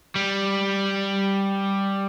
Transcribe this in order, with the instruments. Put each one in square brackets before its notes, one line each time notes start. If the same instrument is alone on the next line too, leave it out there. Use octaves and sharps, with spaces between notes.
[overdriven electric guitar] G3